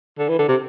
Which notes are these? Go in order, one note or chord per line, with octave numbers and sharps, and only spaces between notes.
D3
E3
D3
C3